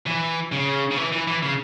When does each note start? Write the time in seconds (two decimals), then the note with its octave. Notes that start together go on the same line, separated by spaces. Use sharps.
0.06 E3
0.52 C#3
0.91 C#3
0.97 E3
1.12 E3
1.27 E3
1.42 C#3